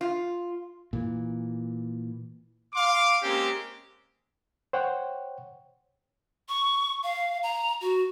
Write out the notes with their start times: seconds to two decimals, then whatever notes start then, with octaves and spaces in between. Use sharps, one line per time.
0.01 F4
0.93 A#2 E3
2.74 F5 C6 D6
3.23 G#3 A#3 C4 C#4 G4
4.73 C5 C#5 F#5 G5
6.49 C#6
7.04 F5
7.43 A#5
7.82 F#4